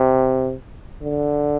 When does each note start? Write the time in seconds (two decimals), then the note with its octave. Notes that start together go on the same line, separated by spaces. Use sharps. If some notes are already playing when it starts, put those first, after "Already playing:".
Already playing: C3
1.02 D3